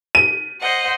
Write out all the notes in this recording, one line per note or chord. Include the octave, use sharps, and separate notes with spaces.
D#7
C5 D#5 F#5